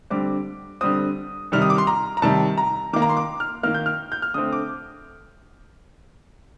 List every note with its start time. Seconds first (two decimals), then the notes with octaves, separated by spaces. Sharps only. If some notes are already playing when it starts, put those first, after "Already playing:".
0.10 D3 G3 C4 D6
0.81 D3 G3 C4 D#6
1.52 C3 D#3 G3 F6
1.62 D#6
1.70 D6
1.78 C6
1.87 A#5
2.17 A#5
2.22 C3 D#3 G3 A5
2.58 A#5
2.93 D#3 A#3 D6
3.02 A#5
3.09 C6
3.17 D6
3.40 F6
3.63 D#3 A#3 F6
3.74 G6
3.86 F6
4.12 G6
4.22 F6
4.34 D3 A3 C4 D#6
4.53 D6